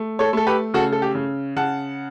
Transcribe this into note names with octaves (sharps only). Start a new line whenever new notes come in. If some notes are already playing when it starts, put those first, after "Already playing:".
Already playing: A3
A4 C#5
A3 A4
G4 B4
C#3 F#4 A4
A4
G4
C#3
C#3 F#5 A5